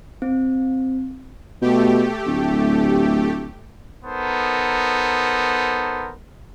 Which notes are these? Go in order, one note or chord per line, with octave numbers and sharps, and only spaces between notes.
C4
B2 A3 G4
D1
B3 D#4 A4 A#4 C5